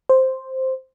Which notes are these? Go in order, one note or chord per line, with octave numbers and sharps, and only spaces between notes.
C5